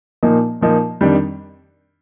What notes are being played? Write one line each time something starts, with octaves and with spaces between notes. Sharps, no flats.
A#2 F3 A#3 D#4
A#2 F3 A#3 D#4
F2 D#3 G3 D4